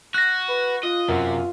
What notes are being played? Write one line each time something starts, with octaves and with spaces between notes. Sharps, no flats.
F#4 F#6 A#6
B4
F4 D#5
F#2 C3 A#4 F#5